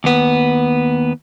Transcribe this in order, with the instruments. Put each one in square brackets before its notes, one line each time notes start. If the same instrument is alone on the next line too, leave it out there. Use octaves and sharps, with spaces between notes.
[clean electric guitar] D#2 B3